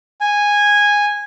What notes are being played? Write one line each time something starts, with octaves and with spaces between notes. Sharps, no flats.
G#5